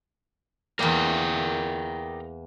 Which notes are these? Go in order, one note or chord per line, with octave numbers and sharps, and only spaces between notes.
E2 A#3 A#4 D5 G5